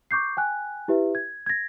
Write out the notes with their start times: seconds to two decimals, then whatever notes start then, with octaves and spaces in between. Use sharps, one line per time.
0.11 C#6 D6 G6 C7
0.37 G5 G#5 F#6
0.88 E4 G4 B4 E5
1.15 G#6
1.46 G#6 A#6